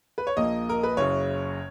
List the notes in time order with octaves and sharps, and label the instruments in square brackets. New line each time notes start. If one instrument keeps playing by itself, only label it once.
[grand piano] B4
C#5
A#1 A#2 A#3 D#5
A#4
B4
F#1 F#2 C#3 C#5